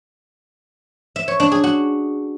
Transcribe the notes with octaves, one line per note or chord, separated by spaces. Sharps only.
E5
C#5
D4
G#4
F#4